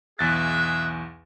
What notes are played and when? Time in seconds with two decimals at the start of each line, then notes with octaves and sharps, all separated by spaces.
0.19 B1 E2 G#4 D#5 E5 F#6 A6